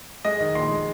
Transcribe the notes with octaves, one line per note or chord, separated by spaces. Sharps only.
G#3 D#5
D#3
A#1 C6
G#3